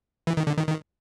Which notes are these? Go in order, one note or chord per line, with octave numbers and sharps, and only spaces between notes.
E3
D#3
D3
D#3
D#3